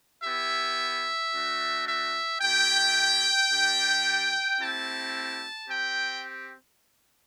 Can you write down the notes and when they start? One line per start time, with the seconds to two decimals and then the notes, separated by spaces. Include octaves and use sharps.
0.23 B3 E4 G4 E5
1.33 A3 D4 F#4
1.87 E5
2.41 A3 E4 G4 G5
3.50 G3 D4 G4
4.60 A3 C4 E4 G4 A5
5.68 C4 G4 G5